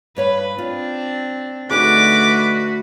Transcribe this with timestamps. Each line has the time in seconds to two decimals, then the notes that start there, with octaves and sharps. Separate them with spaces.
0.17 G2 B4 C#5 F5
0.58 C4 D4 F4
1.71 D3 A3 D4 D#4 F#4 G#4 B4 D6